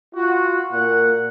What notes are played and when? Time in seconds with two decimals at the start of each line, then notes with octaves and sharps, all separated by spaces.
0.15 F4 F#4
0.71 A#2 A#3 F#5